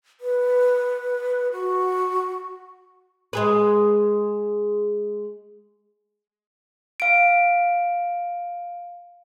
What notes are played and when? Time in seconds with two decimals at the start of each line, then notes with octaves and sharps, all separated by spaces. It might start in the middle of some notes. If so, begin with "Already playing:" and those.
0.21 B4
1.52 F#4
3.33 G#3 G#4 B4
7.00 F5 D7